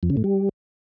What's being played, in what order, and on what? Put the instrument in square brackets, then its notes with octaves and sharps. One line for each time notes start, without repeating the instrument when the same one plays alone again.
[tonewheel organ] F2
C#3
A2
G3